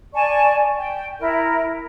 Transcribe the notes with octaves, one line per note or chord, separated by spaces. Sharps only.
D5 G#5 A5 C#6
G5
E4 A#4